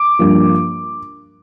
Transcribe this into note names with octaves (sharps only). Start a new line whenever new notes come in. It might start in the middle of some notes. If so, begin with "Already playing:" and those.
Already playing: D6
G2 F3 A#3